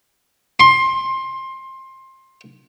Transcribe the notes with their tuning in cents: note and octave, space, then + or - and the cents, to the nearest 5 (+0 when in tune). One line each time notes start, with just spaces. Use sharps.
C6 +20